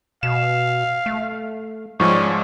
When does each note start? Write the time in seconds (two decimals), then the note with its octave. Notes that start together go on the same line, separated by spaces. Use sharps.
0.23 B2 F5 E7
1.06 A3
2.00 G#2 F3 G3 G#3 C#4 C#6